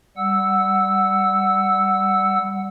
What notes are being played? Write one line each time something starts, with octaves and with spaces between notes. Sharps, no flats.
G3 F#5 E6